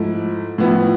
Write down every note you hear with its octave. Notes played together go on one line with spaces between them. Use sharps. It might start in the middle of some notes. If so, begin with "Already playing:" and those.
Already playing: G#2 F3 A3 E4
A2 F3 B3 E4